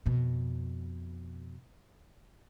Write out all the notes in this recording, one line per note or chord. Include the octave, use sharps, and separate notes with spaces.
F2 B2